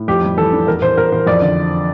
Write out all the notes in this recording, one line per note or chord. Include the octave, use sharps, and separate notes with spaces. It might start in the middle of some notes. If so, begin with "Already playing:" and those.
Already playing: A2
F2 G4
G3
E3 A4
D4
E2 A#4
E2 C5
E2 A#4
E2 C5
F2 D5
D3